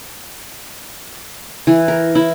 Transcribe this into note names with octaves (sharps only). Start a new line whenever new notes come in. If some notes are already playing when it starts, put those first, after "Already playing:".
E3
A#4
E4